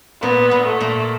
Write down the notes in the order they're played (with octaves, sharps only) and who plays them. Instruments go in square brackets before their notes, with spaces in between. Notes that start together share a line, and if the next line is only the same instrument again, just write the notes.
[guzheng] A#2 [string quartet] B3
[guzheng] A#2
[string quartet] A3
[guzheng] A#2